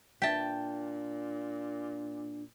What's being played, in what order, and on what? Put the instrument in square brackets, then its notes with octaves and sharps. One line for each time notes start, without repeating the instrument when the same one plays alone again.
[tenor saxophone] A#2 [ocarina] D4 [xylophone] E5 B6 [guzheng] G5 A5